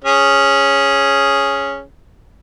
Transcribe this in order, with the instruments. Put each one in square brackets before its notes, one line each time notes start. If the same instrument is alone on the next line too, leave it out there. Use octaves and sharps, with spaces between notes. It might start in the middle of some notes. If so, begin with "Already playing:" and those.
[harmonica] C#4 G#4